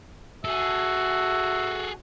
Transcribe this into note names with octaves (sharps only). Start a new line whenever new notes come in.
F#4 G#4 A4 E5